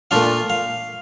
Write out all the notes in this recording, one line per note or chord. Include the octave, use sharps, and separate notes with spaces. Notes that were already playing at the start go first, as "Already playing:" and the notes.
A#2 A3 D4 F4 F5
F5